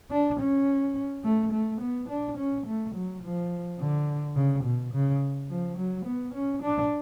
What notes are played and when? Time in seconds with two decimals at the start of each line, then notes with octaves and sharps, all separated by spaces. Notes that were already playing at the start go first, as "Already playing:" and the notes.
0.11 D4
0.40 C#4
1.24 A3
1.53 A3
1.81 B3
2.09 D4
2.37 C#4
2.67 A3
2.95 F#3
3.23 F3
3.79 D3
4.36 C#3
4.64 B2
4.93 C#3
5.50 F3
5.78 F#3
6.05 B3
6.34 C#4
6.62 D4